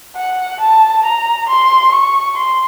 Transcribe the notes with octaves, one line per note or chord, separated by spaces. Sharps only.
F#5
A5
A#5
C6
C#6
C6